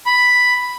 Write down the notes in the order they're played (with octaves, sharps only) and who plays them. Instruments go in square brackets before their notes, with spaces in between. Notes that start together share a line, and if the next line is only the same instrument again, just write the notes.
[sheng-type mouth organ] B5